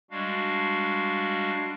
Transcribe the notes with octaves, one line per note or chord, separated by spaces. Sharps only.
G3 G#3 D4 F#4 F5